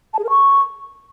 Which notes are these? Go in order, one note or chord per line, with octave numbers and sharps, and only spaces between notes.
A5
G#4
A#4
C#6